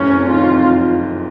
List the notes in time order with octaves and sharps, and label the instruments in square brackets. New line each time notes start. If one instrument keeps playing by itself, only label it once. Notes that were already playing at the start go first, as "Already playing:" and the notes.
Already playing: [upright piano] F#1 A2 [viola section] C#4
[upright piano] C3
[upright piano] D#3 [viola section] F4
[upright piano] F2